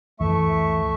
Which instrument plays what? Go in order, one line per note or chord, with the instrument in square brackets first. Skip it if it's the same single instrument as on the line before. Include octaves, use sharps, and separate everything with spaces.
[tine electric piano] C#2 F#2 E3 [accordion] A3 E5 C#6